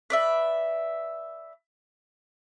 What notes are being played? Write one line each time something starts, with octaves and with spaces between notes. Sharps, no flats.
B4 D5 E5